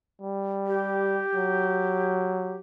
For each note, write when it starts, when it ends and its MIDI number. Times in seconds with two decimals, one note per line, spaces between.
0.21 1.22 55
0.67 2.58 67
1.35 2.59 54